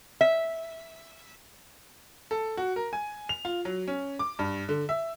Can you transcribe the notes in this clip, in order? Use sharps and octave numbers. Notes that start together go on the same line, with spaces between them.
E5
A4
F#4
A#4
G#5
F7
F4
F#3
C#4
D6
G2
D3
E5